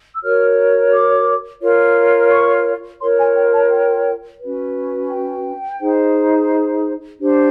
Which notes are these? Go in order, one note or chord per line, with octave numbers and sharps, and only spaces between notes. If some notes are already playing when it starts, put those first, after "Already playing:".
E6
F#4 A#4 C#5 F6
D6
F4 A#4 C#5
C#6
F4 A#4 C#5 C6
G#5
G5
A5
G5
C#4 F#4 B4
G5
D#4 G#4 C5
D4 G4 C5